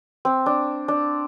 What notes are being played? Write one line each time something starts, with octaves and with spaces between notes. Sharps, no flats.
C4
D4
D4